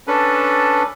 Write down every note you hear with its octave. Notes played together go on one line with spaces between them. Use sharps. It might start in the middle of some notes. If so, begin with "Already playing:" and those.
C#4 D4 A4 B4